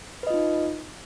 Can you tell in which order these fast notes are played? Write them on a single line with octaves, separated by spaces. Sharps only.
B4 D#5 F4 D#4